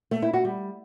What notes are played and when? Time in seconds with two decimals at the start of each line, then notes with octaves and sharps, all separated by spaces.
0.11 A3
0.22 E4
0.33 F#4
0.45 G3